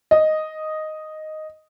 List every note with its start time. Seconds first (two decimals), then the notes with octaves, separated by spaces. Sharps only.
0.11 D#5